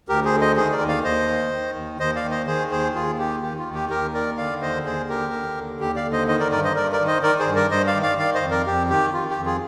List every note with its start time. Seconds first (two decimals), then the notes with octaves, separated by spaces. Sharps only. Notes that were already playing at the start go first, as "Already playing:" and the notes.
0.09 D2 G4 A#4
0.25 G#4 C5
0.34 D3
0.41 C5 D#5
0.57 D#3 G#4 C5
0.72 A#4 D5
0.81 D#2
0.88 D5 F5
1.04 D#2 C5 D#5
1.28 D#3
1.52 D#3
1.75 D#2
2.00 D#2 C5 D#5
2.16 D5 F5
2.24 D#3
2.31 C5 D#5
2.47 D#3 G#4 C5
2.70 D#2 G#4 C5
2.94 D#2 F4 G#4
3.19 D#3 G4
3.42 D#3 G4
3.59 F4
3.66 D#2
3.74 G4
3.90 D#2 G4 A#4
4.14 D#3 A#4 D5
4.37 D3 D5 F5
4.61 D#2 C5 D#5
4.85 D#2 G#4 C5
5.09 D3 G4 A#4
5.33 D3
5.57 D#2
5.80 D#2 G4
5.96 D5 F5
6.05 D3
6.12 C5 D#5
6.28 D#3 C5 D#5
6.40 A#4 D5
6.51 G2 A#4 D5
6.64 C5 D#5
6.75 G2 A#4 D5
6.92 A#4 D5
7.00 D#3
7.07 C5 D#5
7.23 D#3 A#4 D5
7.39 G#4 C5
7.47 G2
7.55 A#4 D5
7.71 G2 C5 D#5
7.87 D5 F5
7.95 D#3
8.02 D5 F5
8.18 D#3 D5 F5
8.34 C5 D#5
8.42 F2
8.51 A#4 D5
8.66 F2 G4
8.90 D#3 G4
9.13 D#3 F4
9.30 G4
9.38 F2
9.46 F4 G#4